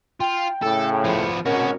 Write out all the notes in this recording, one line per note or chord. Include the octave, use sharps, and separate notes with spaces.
F4 G5
A2 C#3 A4
F3 B3
G#1 C#4 F#4 A#4 D#5